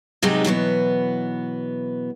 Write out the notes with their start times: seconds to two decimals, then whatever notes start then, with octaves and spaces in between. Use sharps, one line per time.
0.22 C3 F#3 G#3 B3 D#4 G4
0.45 B2 E3 F#3 B3